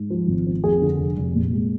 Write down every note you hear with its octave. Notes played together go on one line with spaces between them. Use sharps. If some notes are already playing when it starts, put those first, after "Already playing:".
Already playing: G#2
F3
G#1
C4
F2 G#4
D3
F1
F1
A#2
G#3